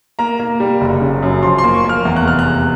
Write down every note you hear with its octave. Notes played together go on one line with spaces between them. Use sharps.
A#3 A#5
A#3
G3
F#1
C#3
F#2
F3 C6
C6
A#3
C#6
A#3
F6
E2
F#6
F1 F6
F#6
E2